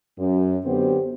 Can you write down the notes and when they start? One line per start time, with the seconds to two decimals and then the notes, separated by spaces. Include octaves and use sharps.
0.18 F#2
0.65 D3 F#3 B3 C4 G4 C5